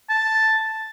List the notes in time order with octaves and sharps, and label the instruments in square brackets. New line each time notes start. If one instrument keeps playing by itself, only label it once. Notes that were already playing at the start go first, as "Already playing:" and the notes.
[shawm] A5